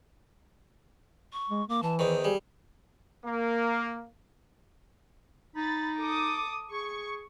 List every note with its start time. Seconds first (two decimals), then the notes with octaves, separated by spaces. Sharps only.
1.33 C#6
1.50 G#3
1.69 A#3 D6
1.83 E3 A5
1.99 E2 D#3 C5
2.24 G3 G#4
3.25 A#3
5.56 D#4 B5 A6
6.01 A4 D6 D#6
6.71 G#4 C#6